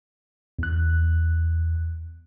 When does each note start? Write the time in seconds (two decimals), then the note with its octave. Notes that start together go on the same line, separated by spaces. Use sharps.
0.59 E2 F#6